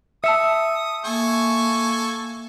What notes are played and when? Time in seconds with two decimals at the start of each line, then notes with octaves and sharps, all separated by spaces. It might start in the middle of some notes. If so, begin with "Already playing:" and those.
0.24 E5 A5 D#6 E6 C#7 E7
1.05 A#3 A4 G#5 C#6